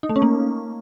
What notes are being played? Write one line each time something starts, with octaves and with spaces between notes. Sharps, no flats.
D#4
A3
C#4
A#3